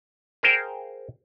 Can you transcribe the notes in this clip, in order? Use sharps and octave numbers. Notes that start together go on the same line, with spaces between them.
G#4 A#4 C5 F5 G5